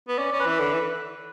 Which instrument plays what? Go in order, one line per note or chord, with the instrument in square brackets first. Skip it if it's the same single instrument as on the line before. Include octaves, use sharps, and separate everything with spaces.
[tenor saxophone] B3
[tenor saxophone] C#4 [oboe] D5
[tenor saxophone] C#4
[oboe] B4
[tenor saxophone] E3
D3
E3